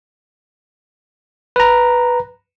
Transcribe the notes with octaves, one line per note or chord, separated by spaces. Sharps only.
B4 A#5